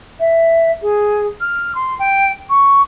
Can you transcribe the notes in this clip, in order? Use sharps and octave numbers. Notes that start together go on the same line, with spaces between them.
E5
G#4
F6
C6
G5
C#6